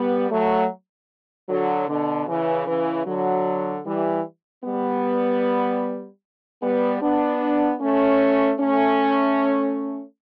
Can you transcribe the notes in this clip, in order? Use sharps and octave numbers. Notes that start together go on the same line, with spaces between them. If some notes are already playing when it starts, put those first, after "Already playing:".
Already playing: G3 B3
F#3 A3
D3 F#3
B2 D3
C#3 E3
C#3 E3
D3 F#3
E3 G3
G3 B3
G3 B3
B3 D4
A3 C#4
A3 C#4